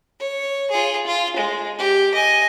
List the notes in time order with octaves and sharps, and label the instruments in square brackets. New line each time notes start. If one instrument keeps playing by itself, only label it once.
[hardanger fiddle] C#5
F4 G#4
F4
G#3
G4
D#5 G#5